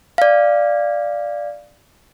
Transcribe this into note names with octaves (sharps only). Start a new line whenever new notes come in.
D5 F5